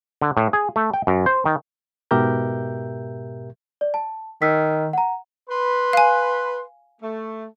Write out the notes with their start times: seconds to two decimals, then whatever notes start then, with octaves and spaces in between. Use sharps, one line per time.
0.22 D3
0.37 A2
0.53 G#4
0.76 A3
0.94 G5
1.07 F#2
1.26 C5
1.45 D#3
2.11 G#2 B2 G4 A#4 E5 G6
3.81 D5
3.94 A5
4.42 D#3 E6 B6
4.93 F#5 A#5
5.50 B4 C6
5.93 F5 G#5
7.02 A3